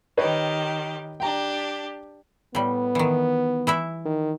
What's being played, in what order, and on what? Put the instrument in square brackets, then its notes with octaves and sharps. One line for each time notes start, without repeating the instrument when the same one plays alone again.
[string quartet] D#3 G4 [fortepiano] B4 C#5 D#5
[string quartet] D4 G4 [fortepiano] G5 A#5
[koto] A2 G3 [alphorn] B3
[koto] D#3 E3
E3 E4 E5
[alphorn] D#3